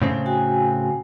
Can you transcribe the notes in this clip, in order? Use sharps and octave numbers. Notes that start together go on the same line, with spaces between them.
A2 C#3 C4
F#4 G5 G#5